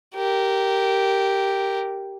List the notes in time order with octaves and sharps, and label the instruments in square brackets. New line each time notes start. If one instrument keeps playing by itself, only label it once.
[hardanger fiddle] G4 A#4